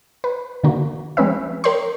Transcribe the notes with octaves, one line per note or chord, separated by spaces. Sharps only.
B4
D3 A#3 F#4
F3 G#3 C4 C#4 B4 E5
A#4 C#5 G5 C6